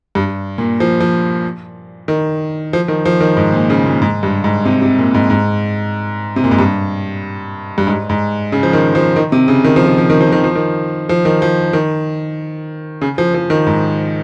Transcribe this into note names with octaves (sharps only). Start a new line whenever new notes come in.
G2
A#2
F3
F3
D#3
F3
D#3
F3
D#3
G#2
A#2
C#3
A#2
G#2
G2
G#2
C3
C3
A#2
G#2
G#2
C3
A#2
G#2
G2
G2
G#2
G#2
C#3
F3
D#3
F3
D#3
C3
C#3
D#3
F3
D#3
F3
D#3
F3
D#3
F3
D#3
F3
D#3
F3
D#3
C#3
F3
F3
D#3
G#2